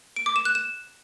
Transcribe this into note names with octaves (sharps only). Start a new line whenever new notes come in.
D7
D6
E7
F#6
E7